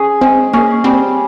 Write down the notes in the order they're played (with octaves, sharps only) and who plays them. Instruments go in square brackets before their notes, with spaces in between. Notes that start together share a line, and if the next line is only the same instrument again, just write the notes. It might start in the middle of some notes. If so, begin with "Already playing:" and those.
Already playing: [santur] C#4 G#4
[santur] G#3 [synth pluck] C4
[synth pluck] A#3 [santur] C#4 G#4
[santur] G3 [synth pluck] C4